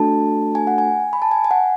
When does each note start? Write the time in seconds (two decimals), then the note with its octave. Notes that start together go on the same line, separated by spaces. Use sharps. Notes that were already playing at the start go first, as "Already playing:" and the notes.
Already playing: A3 D4 F#4 A4 A5
0.55 G#5
0.67 F#5
0.78 G#5
1.13 B5
1.22 A5
1.31 G#5
1.45 G#5
1.51 F#5